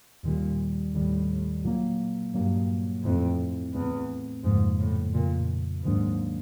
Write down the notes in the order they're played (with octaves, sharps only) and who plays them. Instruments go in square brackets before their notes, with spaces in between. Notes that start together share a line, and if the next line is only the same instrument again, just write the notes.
[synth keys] D#2 D#3 G3 [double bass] A#2
[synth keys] D#2 D#3 G3 [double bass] A2
[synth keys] A#2 F#3 A#3
[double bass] G2 [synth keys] A#2 F#3 A#3
[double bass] F2 [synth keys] A2 E3 A3 C4
[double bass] E2 [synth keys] A2 E3 A3 C4
[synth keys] F2 C#3 F3 A#3 [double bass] G#2
[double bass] A2
[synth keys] F2 C#3 F3 A#3 [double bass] A#2
[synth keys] D#2 D#3 F#3 A#3 D4 [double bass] G#2